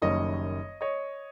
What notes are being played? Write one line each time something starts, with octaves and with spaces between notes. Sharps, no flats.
F#1 F#2 D#3 G3 C#5 D#5
C#5 D#5